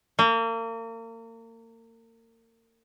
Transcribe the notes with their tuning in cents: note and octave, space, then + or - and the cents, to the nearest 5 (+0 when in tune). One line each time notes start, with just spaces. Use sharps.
A#3 -35